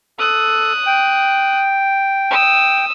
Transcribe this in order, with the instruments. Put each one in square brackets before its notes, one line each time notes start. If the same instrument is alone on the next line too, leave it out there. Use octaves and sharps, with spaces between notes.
[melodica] A4 [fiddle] D#6 F#6
[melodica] G5
[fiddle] D#6 E6